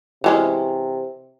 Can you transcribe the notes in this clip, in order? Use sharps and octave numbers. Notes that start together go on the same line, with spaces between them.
C3 E3 G#3 C#4